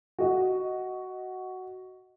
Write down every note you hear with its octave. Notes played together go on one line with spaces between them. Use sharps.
F#4 D#5